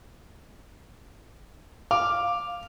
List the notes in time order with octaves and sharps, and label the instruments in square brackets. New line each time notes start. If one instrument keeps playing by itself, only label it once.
[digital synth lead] F5 [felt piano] D6